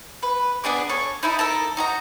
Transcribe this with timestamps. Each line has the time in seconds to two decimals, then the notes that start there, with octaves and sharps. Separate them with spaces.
0.23 B4
0.64 B3 D4 G#4 D6
0.90 A4 C#5
1.23 D#4 E4 A4
1.39 A4 A#4 A5
1.77 D#4 F#4 A#5